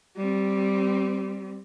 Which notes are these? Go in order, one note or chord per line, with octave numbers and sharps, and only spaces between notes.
G3 C4